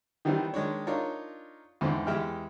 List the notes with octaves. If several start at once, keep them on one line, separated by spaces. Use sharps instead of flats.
D#3 E3 G3 B3 C4
D#3 G#3 D4 C#5
D4 D#4 F4 A#4 C#5
E2 G#2 D3 C4
E2 G#3 G4 E5 G5 F6